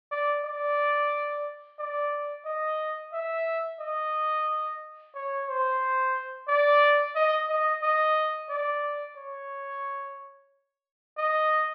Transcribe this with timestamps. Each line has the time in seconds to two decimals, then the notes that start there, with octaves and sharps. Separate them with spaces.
0.11 D5
0.44 D5
1.79 D5
2.46 D#5
3.13 E5
3.80 D#5
5.15 C#5
5.47 C5
6.48 D5
7.16 D#5
7.49 D#5
7.83 D#5
8.49 D5
9.17 C#5
11.18 D#5